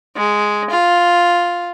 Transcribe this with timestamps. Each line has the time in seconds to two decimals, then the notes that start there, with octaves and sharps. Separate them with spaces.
0.16 G#3
0.70 F4